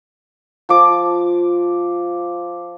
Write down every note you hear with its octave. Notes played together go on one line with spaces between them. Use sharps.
F3 D6